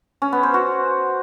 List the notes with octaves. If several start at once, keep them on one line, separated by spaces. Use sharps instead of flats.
C#4
B3
C5
F#4